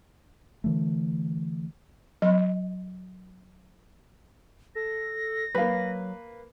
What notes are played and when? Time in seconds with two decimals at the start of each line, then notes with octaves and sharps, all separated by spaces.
0.64 D3 E3 A3
2.22 F#3 D#5
4.75 A4 A#6
5.55 F#3 A#3 B4 F5 B5